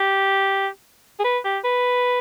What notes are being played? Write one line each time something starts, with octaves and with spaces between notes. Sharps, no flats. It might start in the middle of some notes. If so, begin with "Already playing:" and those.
Already playing: G4
G#4
B4
G4
B4